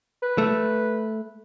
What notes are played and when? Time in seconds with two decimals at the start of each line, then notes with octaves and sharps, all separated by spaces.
0.23 B4
0.38 A3